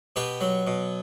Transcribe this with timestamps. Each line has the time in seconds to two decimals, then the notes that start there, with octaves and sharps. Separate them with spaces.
0.16 B2 G4 B4
0.41 F#3
0.67 B2